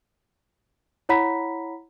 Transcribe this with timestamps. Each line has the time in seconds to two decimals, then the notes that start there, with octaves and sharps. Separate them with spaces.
1.09 E4 C#5 F#5 A#5 B5 B6